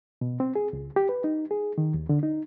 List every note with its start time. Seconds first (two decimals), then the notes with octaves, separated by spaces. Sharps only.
0.21 B2
0.40 C4
0.56 G#4
0.73 C#2
0.96 G4
1.09 B4
1.24 D#4
1.51 G#4
1.78 D#3
1.94 D#2
2.09 D3
2.23 D#4